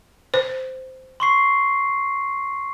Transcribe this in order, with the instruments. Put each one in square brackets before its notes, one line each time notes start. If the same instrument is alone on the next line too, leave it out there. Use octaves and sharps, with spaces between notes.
[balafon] C5
[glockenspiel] C6 C#6 C7